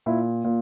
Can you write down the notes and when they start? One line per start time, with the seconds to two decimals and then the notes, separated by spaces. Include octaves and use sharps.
0.06 A#2 E4
0.44 A#2